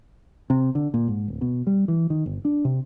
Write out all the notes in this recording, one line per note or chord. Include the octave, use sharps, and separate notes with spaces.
C3
D3
A#2
G#2
D1
B2
G3
E3
D#3
G1
D4
C3